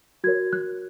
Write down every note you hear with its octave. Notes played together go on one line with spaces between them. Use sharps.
F#4 A#4 C#5 G#6
F#6